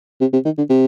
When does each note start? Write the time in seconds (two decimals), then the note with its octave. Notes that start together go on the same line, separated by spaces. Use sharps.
0.21 C3
0.33 C3
0.45 D#3
0.58 D3
0.69 C3